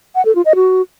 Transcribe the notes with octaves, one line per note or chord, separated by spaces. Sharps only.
F#5
A4
F4
D#5
F#4